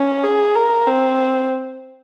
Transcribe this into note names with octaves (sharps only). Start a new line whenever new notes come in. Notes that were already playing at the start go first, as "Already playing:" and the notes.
Already playing: C#4
G#4
A#4
C4